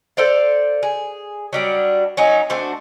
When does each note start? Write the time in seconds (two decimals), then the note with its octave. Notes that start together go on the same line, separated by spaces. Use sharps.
0.17 A4 C5 D5 F5
0.83 G#4
1.53 F#3 G3 D4
2.17 F#3 C#4 D#4
2.50 A3 D4 F#4 C5